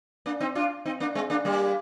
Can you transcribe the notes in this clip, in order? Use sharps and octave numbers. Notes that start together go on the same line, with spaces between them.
A#3 D4
C4 D#4
D4 F4
C4 D#4
A#3 D4
G#3 C4
A#3 D4
G3 A#3